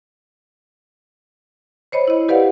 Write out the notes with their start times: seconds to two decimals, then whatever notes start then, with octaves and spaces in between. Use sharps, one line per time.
1.92 C5 C#5 D#5 B5
2.08 E4 D#5
2.29 G4 B4 D5 F5 F#5